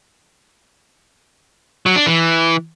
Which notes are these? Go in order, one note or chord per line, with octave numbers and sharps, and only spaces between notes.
F#3
D4
E3